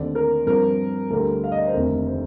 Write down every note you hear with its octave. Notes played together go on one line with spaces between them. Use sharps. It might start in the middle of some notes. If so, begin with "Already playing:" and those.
Already playing: D#2 D3 A3 C4 D5
A#4
G2 F3 C4 A#4
D2 D3 G3 A#4
F5
D#5
D5
C5
F1 D#2 D3 A3 C4 A#4
C5